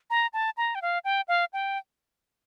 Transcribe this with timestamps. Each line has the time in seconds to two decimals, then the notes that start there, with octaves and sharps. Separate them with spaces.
0.10 A#5
0.33 A5
0.57 A#5
0.75 G5
0.82 F5
1.05 G5
1.28 F5
1.53 G5